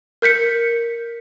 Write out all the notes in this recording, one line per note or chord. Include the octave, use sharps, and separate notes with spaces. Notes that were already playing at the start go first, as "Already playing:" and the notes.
A#4 G6 B6 C#7